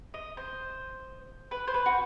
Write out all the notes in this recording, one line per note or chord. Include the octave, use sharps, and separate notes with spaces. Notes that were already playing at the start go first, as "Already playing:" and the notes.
D#5
C5
B4
C5
B4
F#4